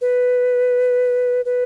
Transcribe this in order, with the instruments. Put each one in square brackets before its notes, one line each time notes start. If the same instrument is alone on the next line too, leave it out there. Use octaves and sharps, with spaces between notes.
[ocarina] B4
B4